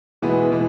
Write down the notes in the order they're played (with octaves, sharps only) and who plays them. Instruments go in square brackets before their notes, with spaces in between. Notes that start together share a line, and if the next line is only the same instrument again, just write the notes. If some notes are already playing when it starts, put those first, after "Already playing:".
[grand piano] B2 G#3 B3 F#4 [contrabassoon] E3
[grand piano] B2 G#3 [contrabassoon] E3